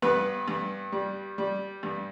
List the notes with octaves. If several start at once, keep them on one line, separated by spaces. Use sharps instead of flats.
G2 B3 B4
G2
G3
G3
G2